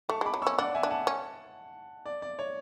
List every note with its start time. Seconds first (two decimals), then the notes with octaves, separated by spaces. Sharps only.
0.09 A3 A5 C#6
0.21 G#3
0.26 B5 D6
0.34 F#3
0.42 C#4 C#6 E6
0.58 D4 D5 F#5
0.75 E5 G#5
0.83 D4
0.91 F#5 A5
1.07 C#4
2.06 D5
2.22 D5
2.39 C#5